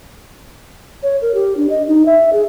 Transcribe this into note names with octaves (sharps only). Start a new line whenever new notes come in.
C#5
A#4
G4
D4
D#5
D#4
E5
G#4